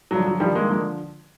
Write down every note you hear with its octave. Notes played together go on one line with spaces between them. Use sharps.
G2 D3 F3 F#3
F#3
G2 D#3 F3 G3
G#3 A#3
D3 F3 G#3 A#3